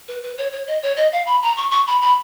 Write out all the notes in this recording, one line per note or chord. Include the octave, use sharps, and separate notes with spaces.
B4
B4
C#5
C#5
D#5
C#5
D#5
F5
B5
A#5
C#6
C#6
B5
B5